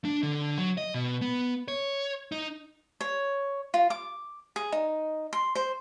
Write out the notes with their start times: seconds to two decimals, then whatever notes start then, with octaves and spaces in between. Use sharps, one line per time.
0.05 D4
0.23 D3
0.58 F#3
0.78 D#5
0.94 B2
1.22 B3
1.68 C#5
2.32 D#4
3.01 C#5
3.74 F4
3.90 D6
4.56 G#4
4.72 D#4
5.33 C6
5.55 C5